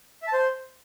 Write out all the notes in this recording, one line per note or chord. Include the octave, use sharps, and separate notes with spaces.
E5
A5
C5